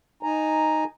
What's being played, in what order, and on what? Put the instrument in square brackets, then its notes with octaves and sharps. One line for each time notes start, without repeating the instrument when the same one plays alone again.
[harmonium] D#4 G#5 A#5